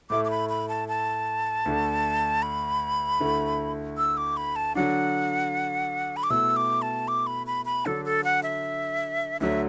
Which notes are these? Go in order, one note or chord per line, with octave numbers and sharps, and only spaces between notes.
A2 A3 E4 D6
D6
B5
B5
A5
A5
D2 D3 A3 D4
B5
D2 D3 A3 E4
E6
D6
B5
A5
D3 F#3 D4 F#5
B5
D6
B2 A3 E4 E6
D6
A5
D6
B5
B5
B5
D3 F#3 D4 A4
A4
F#5
E5
D2 D3 F#3 E5